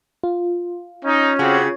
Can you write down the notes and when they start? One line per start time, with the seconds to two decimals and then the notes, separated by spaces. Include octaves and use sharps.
0.23 F4
1.05 C#4 D#4
1.39 C#3 C4 F#4 G4